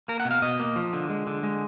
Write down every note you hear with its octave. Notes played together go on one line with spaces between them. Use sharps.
A#3 A#4
F#5
B2
F5
B2 D#5
A#3
F3
D3
G#3
D3
G#3